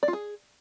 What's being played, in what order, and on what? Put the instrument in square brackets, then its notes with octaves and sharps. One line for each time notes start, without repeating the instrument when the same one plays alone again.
[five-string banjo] D5
F4
G#4